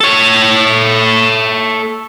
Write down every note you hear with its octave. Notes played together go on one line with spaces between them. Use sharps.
A4 C#5